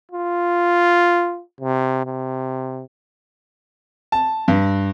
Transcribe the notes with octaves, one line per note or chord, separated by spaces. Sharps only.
F4
C3
C3
A5
G2